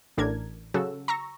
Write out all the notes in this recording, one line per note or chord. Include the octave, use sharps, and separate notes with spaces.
A1 A2 D4 A#4 G#6
C#3 F#3 F#4 A4 E6
A#5 C#6 E6 A#6